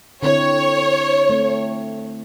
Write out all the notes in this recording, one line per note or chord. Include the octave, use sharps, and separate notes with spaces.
D3 C4 E4 C#5
A3 C4